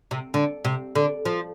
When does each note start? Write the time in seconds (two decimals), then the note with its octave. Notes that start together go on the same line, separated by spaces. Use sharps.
0.11 C3
0.34 D3
0.65 C3
0.95 D3
1.25 F3